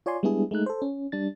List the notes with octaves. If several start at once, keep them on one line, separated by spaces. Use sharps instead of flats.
F4 C#5 D5 G#5 C6
G3 G#3 B3 D4 E4 G#4
G#3 A3 D#4 F#6
A4 C5
C#4
G3 D4 A6